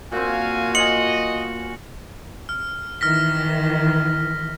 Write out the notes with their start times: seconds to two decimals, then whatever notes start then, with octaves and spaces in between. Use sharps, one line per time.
0.12 A#2 C4 F#4 F5 G#5
0.75 F4 C#5 D#5 G#5 C#7 F#7
2.49 F6
3.01 D#3 E3 F6 A#6 B6